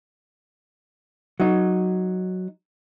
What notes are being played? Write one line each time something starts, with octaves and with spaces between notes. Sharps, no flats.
F#3 D#4